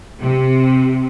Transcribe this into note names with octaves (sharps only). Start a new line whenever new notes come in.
C3